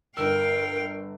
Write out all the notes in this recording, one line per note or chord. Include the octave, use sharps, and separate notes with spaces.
G1 A#4 F5 G5 E6